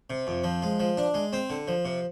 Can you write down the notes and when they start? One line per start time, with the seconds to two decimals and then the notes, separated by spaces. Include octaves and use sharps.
0.10 C3
0.27 F2
0.44 F3
0.62 G#3
0.80 F3
0.97 D4
1.14 G#3
1.33 C4
1.50 D3
1.68 F3
1.85 C3